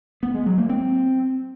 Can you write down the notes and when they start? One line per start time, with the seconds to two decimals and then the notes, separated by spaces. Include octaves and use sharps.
0.23 B3
0.34 G#3
0.46 F#3
0.58 A#3
0.69 C4